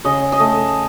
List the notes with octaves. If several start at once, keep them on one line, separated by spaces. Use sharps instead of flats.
C#3 D#5
D#5
A3